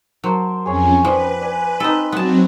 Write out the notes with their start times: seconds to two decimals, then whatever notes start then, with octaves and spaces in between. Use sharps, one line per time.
0.24 F#3 A#4 C5 A5
0.66 F2 C#4 G#4 C#5
1.05 F3 B3 D4 B4 G5
1.41 D5 G#5
1.80 C4 D#4 A4 A5 B5
2.12 F#3 B3 C4 F#4 B4 D#5 A5